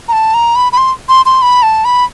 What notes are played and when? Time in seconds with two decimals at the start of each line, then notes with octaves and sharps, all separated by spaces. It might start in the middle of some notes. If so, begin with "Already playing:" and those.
0.08 A#5
0.13 A5
0.34 A#5
0.56 B5
0.72 B5
0.77 C6
1.09 C6
1.26 C6
1.42 B5
1.63 A5
1.85 B5